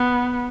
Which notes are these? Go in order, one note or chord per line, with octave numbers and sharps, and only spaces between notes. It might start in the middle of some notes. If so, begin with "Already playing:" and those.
Already playing: B3